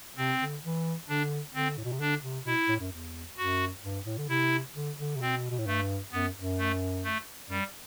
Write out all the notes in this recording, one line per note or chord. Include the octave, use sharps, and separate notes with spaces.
C3 C4
D3
E3
D3 D4
D3 C4
A2
B2
C3
D3 D4
C3
B2 E4
A2
F#2
E2
F#2 F#4
G2
A2
D3
C3 E4
D3
D3
C3
B2 C4
B2
A2
G2 A3
F#2 B3
F#2
A3
A3
F#2 G3